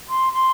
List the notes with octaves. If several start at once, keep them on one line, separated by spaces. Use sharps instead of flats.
C6
C6